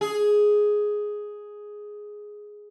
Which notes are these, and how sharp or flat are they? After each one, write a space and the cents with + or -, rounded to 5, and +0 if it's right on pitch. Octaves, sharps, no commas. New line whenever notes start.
G#4 +5